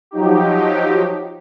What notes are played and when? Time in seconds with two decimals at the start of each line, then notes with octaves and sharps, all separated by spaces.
0.11 F3 F#3 D#4 G4